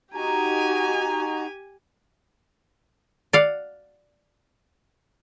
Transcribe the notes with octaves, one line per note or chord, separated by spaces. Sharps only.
D#4 F#4 G4 G#5 A#5
D5 F5 F#5